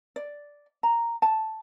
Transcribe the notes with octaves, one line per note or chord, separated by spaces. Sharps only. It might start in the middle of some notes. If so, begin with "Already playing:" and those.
D5
A#5
A5